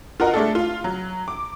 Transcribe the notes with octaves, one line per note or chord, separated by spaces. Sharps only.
F4 F#4 A#4 D#5 F#5
G#3 A3 D4 A4
F4 F5
F#3
D6